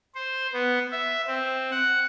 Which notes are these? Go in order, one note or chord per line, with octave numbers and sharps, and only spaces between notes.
C5
B3
E5
C4
F#5